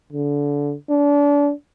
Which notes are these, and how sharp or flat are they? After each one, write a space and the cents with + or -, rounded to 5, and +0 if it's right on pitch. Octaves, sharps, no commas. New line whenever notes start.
D3 -25
D4 -30